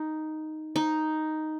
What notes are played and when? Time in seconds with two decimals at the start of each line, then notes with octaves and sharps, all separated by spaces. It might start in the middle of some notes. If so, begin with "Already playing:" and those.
Already playing: D#4
0.76 D#4